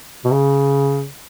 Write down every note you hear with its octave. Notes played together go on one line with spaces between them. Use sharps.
B2
C#3